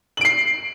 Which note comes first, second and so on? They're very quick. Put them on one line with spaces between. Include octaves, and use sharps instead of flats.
F#7 D7 C7